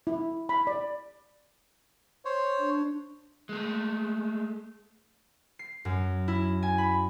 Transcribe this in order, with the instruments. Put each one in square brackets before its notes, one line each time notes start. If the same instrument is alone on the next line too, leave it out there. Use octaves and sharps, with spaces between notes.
[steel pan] E4
B5
D5
[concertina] C5 C#5
[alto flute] D4
[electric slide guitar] G#3 A3
[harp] C7
F#2
E4
G#5
B5